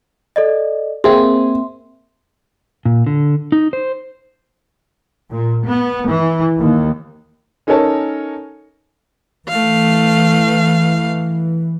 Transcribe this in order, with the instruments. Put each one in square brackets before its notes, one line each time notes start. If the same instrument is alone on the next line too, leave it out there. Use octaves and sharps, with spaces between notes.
[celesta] A4 D5 D#5
[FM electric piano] A#3 C4 [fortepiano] G#4 [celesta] E5 C6
[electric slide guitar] A#2
D3
D#4
C5
[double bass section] A#2
B3
E3
D#2
[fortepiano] C#4 D#4 A4 A#4 C#5 A5
[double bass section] E3 [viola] A3 F5